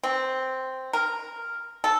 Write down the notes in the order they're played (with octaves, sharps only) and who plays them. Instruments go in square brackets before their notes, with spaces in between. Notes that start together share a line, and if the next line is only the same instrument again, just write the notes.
[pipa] C4
A#4
A4